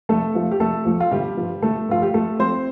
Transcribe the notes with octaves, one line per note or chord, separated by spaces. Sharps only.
F1 A3 A4
F2 F3 A3
G4
F1 A3 A4
F2 F3 A3
F4
G1 G3 G4
G2 F3
G1 A3 A4
G2 F3 F4
G4
F2 A3 A4
F3 A3 C4 C5